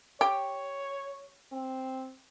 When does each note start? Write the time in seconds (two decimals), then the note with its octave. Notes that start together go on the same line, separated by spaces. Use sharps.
0.21 G4 C#5
1.52 C4